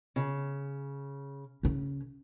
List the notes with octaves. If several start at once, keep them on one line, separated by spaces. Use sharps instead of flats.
C#3
C#3 C#4